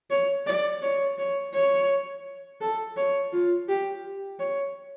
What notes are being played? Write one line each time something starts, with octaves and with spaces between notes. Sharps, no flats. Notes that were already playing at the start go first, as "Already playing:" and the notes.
C#5
D5
C#5
C#5
C#5
A4
C#5
F4
G4
C#5